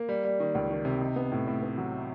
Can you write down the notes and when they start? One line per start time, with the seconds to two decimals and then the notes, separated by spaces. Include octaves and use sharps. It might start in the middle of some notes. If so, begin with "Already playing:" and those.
Already playing: A#3
0.09 G3
0.24 G3
0.40 D#3
0.55 C#2
0.71 D#3
0.85 C3
1.01 D#4
1.16 B3
1.32 A2
1.47 A2
1.62 B3
1.78 F#3